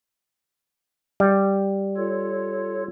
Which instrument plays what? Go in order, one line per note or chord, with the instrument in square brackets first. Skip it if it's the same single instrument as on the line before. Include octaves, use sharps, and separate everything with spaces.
[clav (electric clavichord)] G3
[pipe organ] F4 A4 C#5